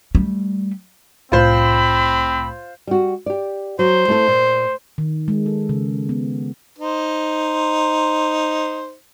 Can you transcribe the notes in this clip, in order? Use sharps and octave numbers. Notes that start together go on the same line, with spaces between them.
G3 A3
C2 A2 C4 F4 C5 B5
G3 F#4
G4 D5
F#3 C5
A3 E4 A4
A#2
D#3
G#3
A4
C#3
B3
D#4 C5